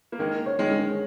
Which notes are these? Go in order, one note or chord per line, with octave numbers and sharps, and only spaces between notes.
A#3
D#3 G#3 A#4
C#5
D#3 G#3
G#3